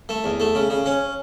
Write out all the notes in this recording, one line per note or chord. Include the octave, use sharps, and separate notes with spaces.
A3
E2
A3
C#3
C#3
C#4